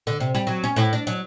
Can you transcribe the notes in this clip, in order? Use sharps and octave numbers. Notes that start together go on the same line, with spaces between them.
D3
C3
G3
F#3
C#4
A2
D4
F#3